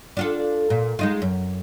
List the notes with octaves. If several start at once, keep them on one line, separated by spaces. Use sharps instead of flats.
D4 F4 A4
A#2
G#3 D#4 F4
F#2